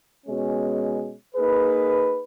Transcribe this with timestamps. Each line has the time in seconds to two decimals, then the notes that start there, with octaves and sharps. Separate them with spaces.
0.25 B2 G#3 C#4
1.34 A#3 D#4 G#4 B4